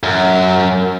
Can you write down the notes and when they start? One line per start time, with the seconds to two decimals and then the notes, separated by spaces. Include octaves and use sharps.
0.03 F#2